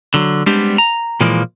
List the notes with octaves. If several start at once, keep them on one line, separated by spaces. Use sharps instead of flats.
D3 F#3
G3 G#3 B3 C4 D4 G4
A#5
A#2 E3 F3 G#3 A#3